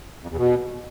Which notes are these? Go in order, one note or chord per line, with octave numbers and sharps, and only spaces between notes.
F2
E2
B2